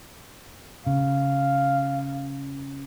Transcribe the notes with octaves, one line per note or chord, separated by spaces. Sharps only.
C#3 F5